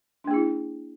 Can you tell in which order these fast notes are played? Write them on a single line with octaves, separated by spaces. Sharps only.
D4 A#3 G#4 E4